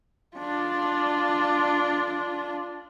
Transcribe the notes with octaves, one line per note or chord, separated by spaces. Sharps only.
D4 F4